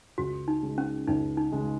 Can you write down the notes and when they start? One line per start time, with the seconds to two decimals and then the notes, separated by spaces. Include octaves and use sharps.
0.18 C#2 F#4
0.48 D#4
0.63 C#3 G#3
0.78 C#4
1.07 C#2 D#4
1.37 D#4
1.52 C#3 G#3